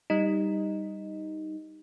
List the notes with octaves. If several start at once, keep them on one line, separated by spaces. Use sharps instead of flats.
G3 D#4